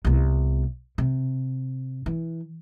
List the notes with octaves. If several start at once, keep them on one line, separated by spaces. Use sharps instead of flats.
C2 B3
C3
E3